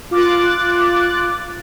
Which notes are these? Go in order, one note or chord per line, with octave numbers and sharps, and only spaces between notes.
F4 D6 F#6 A6